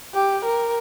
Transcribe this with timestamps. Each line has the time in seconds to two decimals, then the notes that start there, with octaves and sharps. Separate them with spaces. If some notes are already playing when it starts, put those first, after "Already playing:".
0.14 G4
0.45 A#4